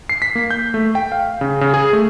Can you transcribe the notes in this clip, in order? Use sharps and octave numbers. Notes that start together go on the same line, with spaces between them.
C7
B6
A#3
G6
A3
G5
F5
C#3
C#3
G#4
A3